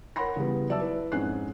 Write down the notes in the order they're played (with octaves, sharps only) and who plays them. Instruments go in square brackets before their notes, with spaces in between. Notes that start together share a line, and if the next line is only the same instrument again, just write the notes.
[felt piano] A#4 C#5 F#5 B5 C6 A#6
C#3 E3 G3 B3
F#3 D5 E5 A5 E6
E4 B4
F2 G#2 C#4 D#4 F#6 C7